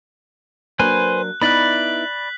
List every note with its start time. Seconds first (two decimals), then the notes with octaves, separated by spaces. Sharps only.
0.79 F#3 A#3 D4 B4 C5 G#5 F#6
1.42 B3 D#4 E4 D5 B5 F#6 B6 F#7